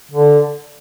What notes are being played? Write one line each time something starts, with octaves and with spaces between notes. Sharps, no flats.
D3